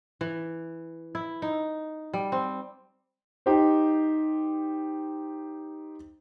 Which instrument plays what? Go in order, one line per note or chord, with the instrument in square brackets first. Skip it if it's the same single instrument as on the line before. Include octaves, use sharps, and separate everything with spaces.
[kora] E3
E4
D#4
G3
C4
[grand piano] D#4 G4 C5